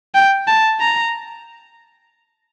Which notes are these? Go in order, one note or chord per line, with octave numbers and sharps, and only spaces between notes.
G5
A5
A#5